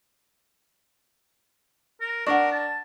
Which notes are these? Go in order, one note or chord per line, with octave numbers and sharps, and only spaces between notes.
A#4
D4 A#4 F#5 C#6
A5